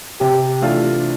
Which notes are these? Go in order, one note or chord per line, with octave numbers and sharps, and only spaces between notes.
C3 G4
E3 A3 D4 F4